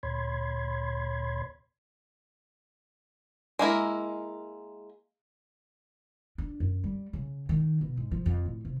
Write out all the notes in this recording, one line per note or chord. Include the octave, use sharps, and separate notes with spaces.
D2 A#2 C#5 B5 C6 G#6
G#3 A#3 E4 A#4
D4
F#2
G3
C#3
D#3
B2
G#2
F3
F2
A2
C3